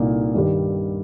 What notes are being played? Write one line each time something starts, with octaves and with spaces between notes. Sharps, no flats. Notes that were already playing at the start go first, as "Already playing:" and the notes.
Already playing: C2 A#2 A#3 D#4
G2 D#3 G3